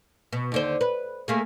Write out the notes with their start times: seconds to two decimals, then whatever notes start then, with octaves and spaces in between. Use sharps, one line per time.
0.33 B2
0.52 D#2 D3 C5
0.81 B4
1.28 A3 A#3 G#4